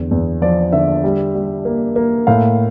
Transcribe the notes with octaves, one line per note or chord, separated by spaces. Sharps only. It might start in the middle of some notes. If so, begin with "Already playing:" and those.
Already playing: E2 D3
E2
F3 D5
D3 E5
G3
G3
A#3
A#3
A2 F5